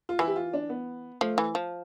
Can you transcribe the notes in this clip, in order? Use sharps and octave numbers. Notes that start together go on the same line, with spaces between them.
F4
E3 E4
G4
F4
D4
B3
F3 A3
E3
F3